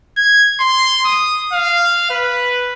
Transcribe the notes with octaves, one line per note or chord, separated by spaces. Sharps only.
G#6
C6
D#6
F5
B4